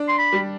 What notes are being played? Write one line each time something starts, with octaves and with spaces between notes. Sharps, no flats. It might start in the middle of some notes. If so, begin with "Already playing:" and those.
Already playing: D4
C6
B5
G3